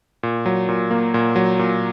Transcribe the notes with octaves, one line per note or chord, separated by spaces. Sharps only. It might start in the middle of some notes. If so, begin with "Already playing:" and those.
A#2
F#3
A#2
A#3
A#2
F#3
A#2